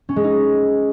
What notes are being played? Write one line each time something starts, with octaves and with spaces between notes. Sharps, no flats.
C#4
G#3
D#4